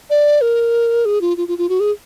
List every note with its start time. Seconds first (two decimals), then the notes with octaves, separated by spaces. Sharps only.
0.10 D5
0.41 A#4
1.05 G#4
1.21 F4
1.37 F4
1.48 F4
1.58 F4
1.69 F#4
1.80 G#4